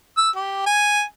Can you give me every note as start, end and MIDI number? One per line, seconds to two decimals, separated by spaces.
0.17 0.30 88
0.36 0.63 67
0.66 1.03 80